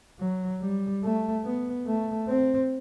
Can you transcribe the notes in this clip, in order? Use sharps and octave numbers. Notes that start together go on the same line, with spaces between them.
F#3
G3
A3
B3
A3
C4